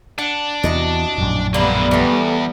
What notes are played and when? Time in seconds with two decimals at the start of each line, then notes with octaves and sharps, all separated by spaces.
0.19 D4 F#5
0.64 E2 C3 E3 F#4 D#5
1.18 A#1 F#2 A2
1.54 D3 G3 A#3 B3 D4 E4
1.91 E2 E3 A3